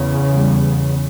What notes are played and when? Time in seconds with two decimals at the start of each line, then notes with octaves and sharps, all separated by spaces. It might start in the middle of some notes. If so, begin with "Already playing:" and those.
Already playing: E2 C#3
0.35 G3